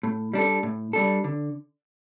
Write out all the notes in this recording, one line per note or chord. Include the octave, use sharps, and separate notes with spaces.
A2
G3 D4 A4
A2
G3 D4 A4
D3